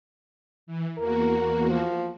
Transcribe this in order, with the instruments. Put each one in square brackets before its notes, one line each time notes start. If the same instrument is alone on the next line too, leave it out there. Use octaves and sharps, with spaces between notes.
[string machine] E3
[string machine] E2 A#3 F#4 [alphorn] A#4
[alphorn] F3